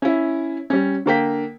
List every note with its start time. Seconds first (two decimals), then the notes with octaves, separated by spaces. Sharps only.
0.02 C#4 E4
0.70 G3 C#4
1.06 D3 A#3 G5 B6